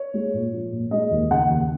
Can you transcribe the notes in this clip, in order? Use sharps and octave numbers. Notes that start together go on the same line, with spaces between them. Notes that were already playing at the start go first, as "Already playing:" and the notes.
Already playing: C#5
G#3
A#2
F3
A#2
G#3 D#5
D#2
C#3 F#5
D#2